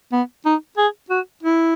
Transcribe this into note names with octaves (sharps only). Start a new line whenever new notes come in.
B3
D#4
G#4
F#4
E4